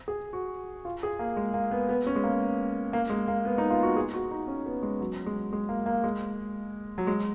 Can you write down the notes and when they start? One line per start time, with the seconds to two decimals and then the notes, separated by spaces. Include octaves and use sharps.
0.08 G#4
0.33 F#4
0.85 F4
1.03 G#4
1.19 A#3
1.37 G#3
1.54 A#3
1.71 B3
1.89 B3
2.06 C#4
2.16 G#3
2.24 A#3
2.93 A#3
3.10 G#3
3.28 A#3
3.45 B3
3.58 D#4
3.70 F4
3.83 F#4
3.96 G#4
4.14 F#4
4.31 D#4
4.48 C#4
4.66 B3
4.83 G#3
5.01 F#3
5.26 G#3
5.53 G#3
5.69 A#3
5.86 A#3
6.04 G#3
6.98 F#3
7.07 G#3